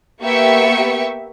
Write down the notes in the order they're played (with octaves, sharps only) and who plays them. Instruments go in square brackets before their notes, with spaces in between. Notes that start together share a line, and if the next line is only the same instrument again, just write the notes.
[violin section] A#3 B3 G4 E5 C#6 C#7